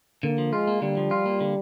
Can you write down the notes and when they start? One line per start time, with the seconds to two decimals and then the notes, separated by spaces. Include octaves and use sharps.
0.23 D3 A#3
0.38 F3
0.53 G#3 F4
0.67 A#3
0.82 D3 G3
0.97 F3
1.11 F4
1.26 A#3
1.41 D3